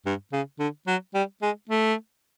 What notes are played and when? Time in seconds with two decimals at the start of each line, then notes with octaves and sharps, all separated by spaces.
0.06 G2
0.33 C#3
0.59 D3
0.87 F#3
1.14 G3
1.42 G#3
1.69 A3